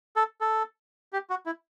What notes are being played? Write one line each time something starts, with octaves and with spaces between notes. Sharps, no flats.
A4
A4
G4
F#4
E4